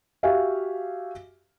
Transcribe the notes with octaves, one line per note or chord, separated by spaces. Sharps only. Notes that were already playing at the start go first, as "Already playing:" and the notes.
F#4 G4 E5 F5 G#5